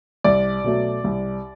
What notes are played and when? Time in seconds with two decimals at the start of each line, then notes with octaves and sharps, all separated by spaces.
0.24 C2 D5
0.64 B2 F#3 A3
1.04 C2